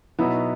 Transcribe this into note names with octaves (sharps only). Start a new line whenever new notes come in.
B2 F#3 B3 E4